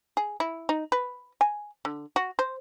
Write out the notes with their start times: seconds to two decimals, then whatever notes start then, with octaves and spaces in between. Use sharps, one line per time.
0.17 G#4
0.40 E4
0.69 D#4
0.92 B4
1.41 G#5
1.85 D3
2.16 F#4
2.39 C5